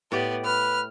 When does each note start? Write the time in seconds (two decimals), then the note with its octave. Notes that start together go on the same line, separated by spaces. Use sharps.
0.12 A2 B3 G4 D5
0.45 B4 F6